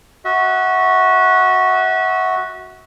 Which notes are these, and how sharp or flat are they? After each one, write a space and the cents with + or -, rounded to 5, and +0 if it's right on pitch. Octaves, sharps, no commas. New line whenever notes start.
F#4 +0 E5 -35